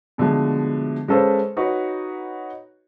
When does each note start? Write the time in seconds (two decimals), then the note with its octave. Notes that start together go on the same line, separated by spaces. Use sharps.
0.18 B2 D3 F3 G#3 A3
1.08 G#3 C#4 A4 B4 C5 F5
1.57 D#4 F#4 B4 C#5